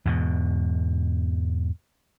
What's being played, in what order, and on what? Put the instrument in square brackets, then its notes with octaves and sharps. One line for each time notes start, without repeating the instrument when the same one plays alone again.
[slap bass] E2 G#2 B2